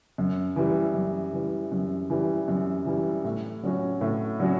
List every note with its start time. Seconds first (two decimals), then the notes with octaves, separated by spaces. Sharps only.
0.18 F#2
0.56 E3 G3
0.94 F#2
1.33 E3 G3
1.72 F#2
2.10 E3 G3
2.48 F#2
2.86 E3 G3
3.24 A2
3.63 F#3 C#4 F#4
4.01 A2
4.40 F#3 C#4 F#4